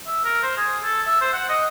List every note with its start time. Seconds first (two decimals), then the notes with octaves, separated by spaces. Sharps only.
0.07 E5
0.24 A#4
0.43 C5
0.57 G#4
0.83 A4
1.07 E5
1.21 C5
1.33 F#5
1.49 D#5